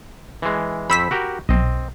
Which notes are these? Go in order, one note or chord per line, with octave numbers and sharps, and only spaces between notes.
E3 G#3
F2 C5 B5 E6 B6
F#4 G4 A#4
B1 C4 D#5